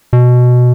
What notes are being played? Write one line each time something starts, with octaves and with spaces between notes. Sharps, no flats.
B2